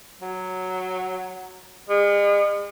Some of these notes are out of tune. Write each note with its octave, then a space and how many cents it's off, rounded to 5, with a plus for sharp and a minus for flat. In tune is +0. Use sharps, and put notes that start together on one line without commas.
F#3 +0
G#3 -40